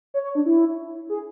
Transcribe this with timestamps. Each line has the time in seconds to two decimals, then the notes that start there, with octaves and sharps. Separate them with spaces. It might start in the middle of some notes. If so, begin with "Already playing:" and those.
0.14 C#5
0.24 C#5
0.35 D4
0.46 E4
1.09 G#4